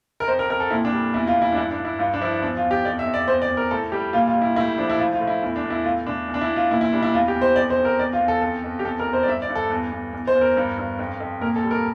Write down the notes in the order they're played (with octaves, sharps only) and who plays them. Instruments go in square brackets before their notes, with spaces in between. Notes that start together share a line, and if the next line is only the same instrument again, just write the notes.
[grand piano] A#4
F2 C5
A#4
F2 A#4
A4
A#2 E4
D4
G3
E2 E4
F4
E2
E4
D4
G2 E4
D4
G2
E4
G2 F4
D4
F3 E4
E2 D4
F4
E2
G4
F2 D5
E5
F2
D5
E2 C5
D5
E2
A#4
A2 A4
G3 G4
A#2 F4
F4
G3
E4
A2 E4
F3 D4
E4
A2 F4
F4
A2
E4
E2 E4
D4
E2
E4
A2 F4
A2 D4
E2
D4
E4
E2
F4
A#2 E4
E4
G3 D4
E4
E2 F4
G4
E2
C5
F2 D5
C5
F2
A#4
E2 D5
F4
E2
A4
F2 A4
F2
G4
E2 A4
A#4
E2
C5
D5
G2 E5
D5
G2
A4
E2
E2
E2
C5
E2
A#4
G2
G2
F2
F2
A#2 A#4
A4
G3
A#4